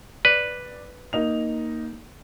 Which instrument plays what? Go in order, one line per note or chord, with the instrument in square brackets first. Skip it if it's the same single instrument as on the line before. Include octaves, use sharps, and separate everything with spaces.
[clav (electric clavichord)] B4 [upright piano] D5
[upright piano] A#3 D#4 F7